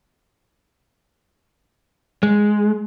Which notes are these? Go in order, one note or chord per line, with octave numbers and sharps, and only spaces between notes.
G#3